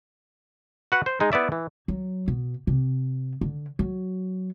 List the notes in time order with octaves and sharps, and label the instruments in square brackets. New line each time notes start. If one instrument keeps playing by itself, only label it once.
[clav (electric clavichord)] F#4 B4 F#5
C5
G#3 D#4
B3 E4 D5 E5
E3
[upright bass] F#3
B2
C3
D3
F#3